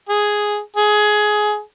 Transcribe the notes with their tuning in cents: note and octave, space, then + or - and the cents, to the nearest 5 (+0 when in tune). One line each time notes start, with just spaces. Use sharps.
G#4 +0
G#4 +15